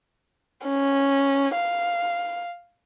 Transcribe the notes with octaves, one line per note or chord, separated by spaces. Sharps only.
C#4
F5